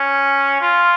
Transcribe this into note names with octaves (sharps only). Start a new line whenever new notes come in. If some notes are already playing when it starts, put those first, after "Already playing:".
Already playing: C#4
F4